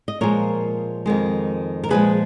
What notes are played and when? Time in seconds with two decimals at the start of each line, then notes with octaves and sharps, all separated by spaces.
0.08 D#5
0.21 A#2 F3 G#3 A#4 C#5
1.06 F2 D#3 G#3
1.84 A#4
1.90 A#2 F3 G#3 G#4 B4